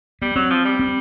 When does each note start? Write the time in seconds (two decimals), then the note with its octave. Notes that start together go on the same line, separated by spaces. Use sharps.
0.22 G3 B3
0.36 F#3 C4
0.51 F3
0.65 G3
0.79 C4